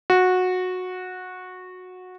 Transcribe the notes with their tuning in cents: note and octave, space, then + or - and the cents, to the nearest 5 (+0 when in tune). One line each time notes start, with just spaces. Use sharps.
F#4 -15